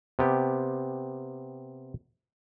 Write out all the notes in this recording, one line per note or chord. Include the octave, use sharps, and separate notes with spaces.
C3 B3 G4